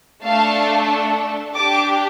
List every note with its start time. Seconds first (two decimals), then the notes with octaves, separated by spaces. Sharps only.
0.24 A3 D4 A4 F5 A5
1.55 D4 G4 A5 D6